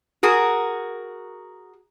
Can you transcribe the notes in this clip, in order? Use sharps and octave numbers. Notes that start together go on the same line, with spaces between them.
F#4 G#4 A#4